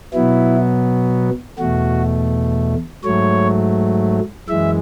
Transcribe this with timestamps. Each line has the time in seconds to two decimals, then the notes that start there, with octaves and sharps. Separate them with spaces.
0.13 B2 F#3 B3 E4
1.59 E2 B2 A3 F#4
3.04 G#2 F#3 A3 C#5
4.49 F#2 E3 G#3 E5